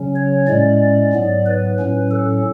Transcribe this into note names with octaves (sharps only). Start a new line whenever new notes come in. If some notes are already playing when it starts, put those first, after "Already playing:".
Already playing: C#3 F#3 C#4
C#5
A2 G#3 C#4 D5
G#2 F#3 B3
B4
A2 F#3 C#4
A4